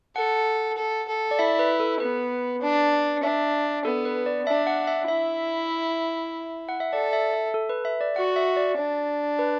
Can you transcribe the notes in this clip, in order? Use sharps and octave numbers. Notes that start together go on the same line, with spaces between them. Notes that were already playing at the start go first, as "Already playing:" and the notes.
A4 F#5
A4
A4
D5
E4 E5
B4
A4
B3 B4
D4
D4 E5
B3 A4
B4
D5
D4 E5
F#5
E5
E4 E5
F#5
E5
A4 D5
E5
E5
A4
B4
E5
D5
F#4 F#5
E5
D5
D4
B4